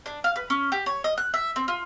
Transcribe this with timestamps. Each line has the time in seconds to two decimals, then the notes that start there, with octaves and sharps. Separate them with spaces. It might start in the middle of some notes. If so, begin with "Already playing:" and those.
0.06 D4
0.24 F5
0.36 B4
0.50 C#4
0.72 G4
0.86 C#5
1.04 D#5
1.18 F#6
1.34 E5
1.56 C4
1.68 F4